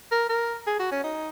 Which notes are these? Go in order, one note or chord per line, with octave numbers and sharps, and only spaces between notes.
A#4
A#4
G#4
F#4
C#4
D#4